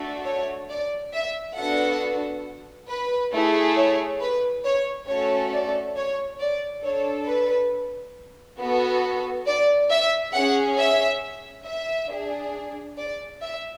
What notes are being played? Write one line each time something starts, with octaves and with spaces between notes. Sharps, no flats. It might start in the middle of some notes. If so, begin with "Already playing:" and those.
Already playing: A3 D4 F#4 A4
C#5
D5
E5
B3 D4 F#4 A4 F#5
B4
A3 E4 G#4
C#5
B4
C#5
A3 C#4 F#4 A4 C#5
D5
C#5
D5
D4 A4 C#5
B4
B3 F#4 A4
D5
E5
C#4 G#4 F#5
E5
E5
D4 G#4
D5
E5